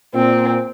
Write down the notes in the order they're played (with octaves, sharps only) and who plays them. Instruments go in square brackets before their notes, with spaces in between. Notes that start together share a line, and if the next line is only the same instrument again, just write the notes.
[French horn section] A#2 [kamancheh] C4